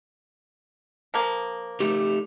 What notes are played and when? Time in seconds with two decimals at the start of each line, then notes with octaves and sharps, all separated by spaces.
1.14 F3 A#3
1.80 A3 D#4 G4